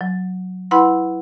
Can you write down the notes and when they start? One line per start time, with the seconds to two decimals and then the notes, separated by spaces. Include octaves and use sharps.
0.01 F#3
0.71 E4 B4 F#5 B5 C6